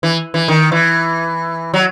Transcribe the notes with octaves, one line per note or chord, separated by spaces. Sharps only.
E3
E3
D#3
E3
F#3